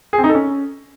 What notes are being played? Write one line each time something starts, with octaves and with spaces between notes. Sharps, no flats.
G#4
C4
D#4
A4
C#4